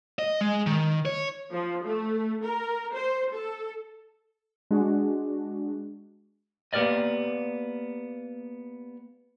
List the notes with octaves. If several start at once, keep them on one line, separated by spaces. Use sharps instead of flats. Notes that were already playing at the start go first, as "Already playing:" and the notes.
D#5
G#3
D#3
C#5
F3
A3
A#4
C5
A4
G#3 D4 F#4
A#3 B3 G4 A#4 D5 D#5